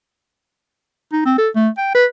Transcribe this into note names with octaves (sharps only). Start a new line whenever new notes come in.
D#4
C4
A4
A3
G5
B4